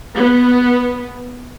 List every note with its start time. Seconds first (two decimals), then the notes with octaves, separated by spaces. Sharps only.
0.14 B3